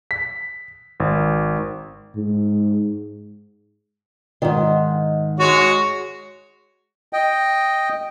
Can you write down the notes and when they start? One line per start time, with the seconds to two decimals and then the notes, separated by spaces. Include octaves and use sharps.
0.11 B6
1.00 G#1
2.16 G#2
4.42 G#2 D#3
5.40 G#3 F#4 C#5
7.13 D#5 G5